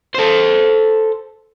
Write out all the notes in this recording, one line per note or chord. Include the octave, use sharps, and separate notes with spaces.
A4 C5